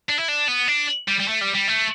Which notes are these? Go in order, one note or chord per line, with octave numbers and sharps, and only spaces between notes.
D4
E4
D4
B3
D4
G3
G3
A3
G3
G3
A3